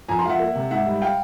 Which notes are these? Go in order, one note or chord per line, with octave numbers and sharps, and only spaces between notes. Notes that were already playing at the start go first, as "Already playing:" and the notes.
F2 G#5 A#5
A#5 C6
F3 E5 F5 F#5
A#3
C3
G#2 E5 F#5
G3
F5 G5